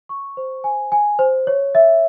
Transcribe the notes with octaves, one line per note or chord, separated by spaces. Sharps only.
C#6
C5
G#5
G#5
C5
C#5
E5